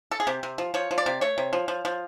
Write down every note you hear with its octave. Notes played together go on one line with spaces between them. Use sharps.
A4
G#4
C3 G4
C3
F3
F3 C#5
F3
D5
C3
A3 C#5
C3
F3
F3
F3